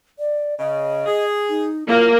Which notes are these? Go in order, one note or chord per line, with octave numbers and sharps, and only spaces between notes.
D5
C#3 D#5
G#4
D#4
F#2 A#3 E4 F4